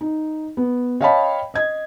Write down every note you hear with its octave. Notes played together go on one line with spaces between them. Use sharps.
D#4
B3
C#5 D#5 F5 G5 A5 B5
D#5 G#6